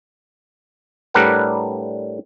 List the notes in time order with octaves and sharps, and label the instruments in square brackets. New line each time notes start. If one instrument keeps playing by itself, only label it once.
[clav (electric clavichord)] A2 G3 D4 A#4 B4 F#5